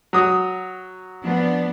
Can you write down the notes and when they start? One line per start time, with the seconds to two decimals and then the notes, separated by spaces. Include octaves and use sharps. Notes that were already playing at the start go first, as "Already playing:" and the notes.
0.13 F#3 D#6
1.22 F3 B3 D4